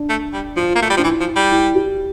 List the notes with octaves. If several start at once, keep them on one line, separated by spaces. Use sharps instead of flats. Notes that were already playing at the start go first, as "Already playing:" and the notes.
Already playing: D4
A3
G3
F3 F4
A#3
A3 F4
G3
F3 D4
E3 E4
F3
E4
G3
E4
G4